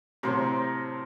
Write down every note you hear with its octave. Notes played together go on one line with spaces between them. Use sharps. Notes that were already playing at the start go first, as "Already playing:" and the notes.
A2 C3 F#3 A#4 C5 C6